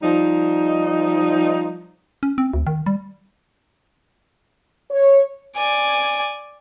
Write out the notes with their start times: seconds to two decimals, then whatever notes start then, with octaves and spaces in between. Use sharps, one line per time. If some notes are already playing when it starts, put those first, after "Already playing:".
0.03 F3 G3 D#4
2.23 C#4
2.38 C4
2.54 D2
2.67 D#3
2.86 G3
4.91 C#5
5.57 D5 G#5